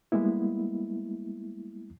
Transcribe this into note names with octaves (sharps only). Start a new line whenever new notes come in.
G3 G#3 A#3 B3 E4